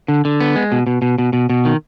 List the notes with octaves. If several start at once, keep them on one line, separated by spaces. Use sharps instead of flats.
D3
D3
B3
G#3
B2
B2
B2
B2
B2
B2
D#3